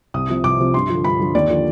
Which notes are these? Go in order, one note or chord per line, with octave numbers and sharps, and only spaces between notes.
C2 D#6
C3 F3
C2 D6
C3 F3
G2 C6
D3 F3
G2 B5
D3 F3
D#2 D5
D3 F3